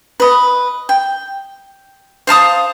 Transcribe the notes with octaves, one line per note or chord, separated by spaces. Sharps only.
B4 D#5
G5
C5 F5 A5 D#6